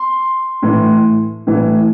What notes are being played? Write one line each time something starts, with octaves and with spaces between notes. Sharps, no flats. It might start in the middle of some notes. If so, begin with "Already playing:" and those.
Already playing: C6
A2 E3
A2 E3